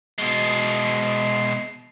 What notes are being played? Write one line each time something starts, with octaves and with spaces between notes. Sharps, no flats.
B2 G#3